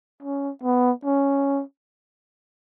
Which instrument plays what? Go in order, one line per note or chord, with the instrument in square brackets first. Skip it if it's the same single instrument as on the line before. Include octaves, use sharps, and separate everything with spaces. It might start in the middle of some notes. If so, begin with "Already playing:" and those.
[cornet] C#4
B3
C#4